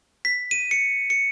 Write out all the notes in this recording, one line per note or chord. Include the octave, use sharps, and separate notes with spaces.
B6
D#7
C#7
C#7